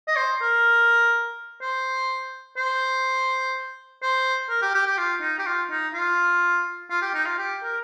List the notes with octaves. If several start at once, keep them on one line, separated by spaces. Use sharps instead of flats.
D#5
C5
A#4
C5
C5
C5
A#4
G4
G4
G4
F4
D#4
G4
F4
D#4
F4
F4
G4
D#4
F4
G4
A#4